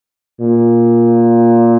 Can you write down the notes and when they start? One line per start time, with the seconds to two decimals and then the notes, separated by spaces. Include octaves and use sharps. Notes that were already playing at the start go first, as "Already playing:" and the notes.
0.41 A#2